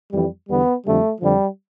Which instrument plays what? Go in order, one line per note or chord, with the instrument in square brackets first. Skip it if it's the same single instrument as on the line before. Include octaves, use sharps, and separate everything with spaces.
[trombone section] F2 E3 G3
E2 D3 G3 B3
F2 D3 G3 A3
F2 D3 F3 G3